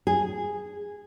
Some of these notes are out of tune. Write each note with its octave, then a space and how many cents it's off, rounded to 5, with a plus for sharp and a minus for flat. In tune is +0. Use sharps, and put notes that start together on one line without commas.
G#4 -10